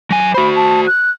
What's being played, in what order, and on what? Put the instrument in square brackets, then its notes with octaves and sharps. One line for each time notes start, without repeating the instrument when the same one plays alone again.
[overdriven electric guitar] F#3 G#5
[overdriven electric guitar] F#4 C5 [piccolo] B5
[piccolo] A5
F#6